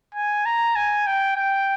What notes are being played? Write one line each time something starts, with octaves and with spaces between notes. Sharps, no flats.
G#5
A#5
G#5
G5
G5